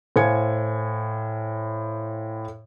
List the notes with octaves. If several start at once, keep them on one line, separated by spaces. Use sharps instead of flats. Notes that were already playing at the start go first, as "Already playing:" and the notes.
A2 C5 F5 G#5 G#6 C#7